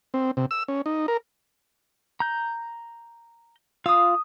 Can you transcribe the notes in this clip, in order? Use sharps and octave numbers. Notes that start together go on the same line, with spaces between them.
C4
C3
E6
C#4
D#4
A#4
A#5 G6
F4 F5 D#6 E6